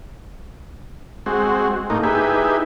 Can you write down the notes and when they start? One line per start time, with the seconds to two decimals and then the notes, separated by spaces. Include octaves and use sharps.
1.26 G#3 C4 F#4
1.90 A2 A#3 D#4
2.03 D#4 E4 G4 G#4 B4